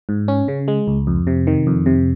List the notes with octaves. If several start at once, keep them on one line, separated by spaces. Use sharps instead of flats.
G#2
C#4
C#3
G#3
C#2
F2
C3
D#3
F2
C3